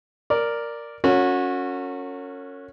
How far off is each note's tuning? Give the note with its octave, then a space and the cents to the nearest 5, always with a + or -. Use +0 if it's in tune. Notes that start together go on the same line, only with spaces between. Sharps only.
A#4 +0 D5 +0
C#4 +0 F#4 -25 A#4 -40